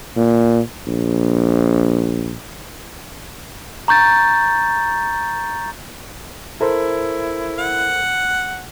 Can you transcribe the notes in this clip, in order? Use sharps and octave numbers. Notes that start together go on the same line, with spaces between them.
A#2
A#1
A#5 C#6 G6 A6
E4 A4 A#4 C5
F#5